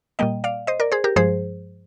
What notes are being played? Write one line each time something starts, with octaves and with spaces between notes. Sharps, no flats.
A#2 G3 A#3 D#5 G5
D5 F5
C5 D#5
A#4 D5
G#4 C5
G4 A#4
G2 F3 G#3 G#4 C5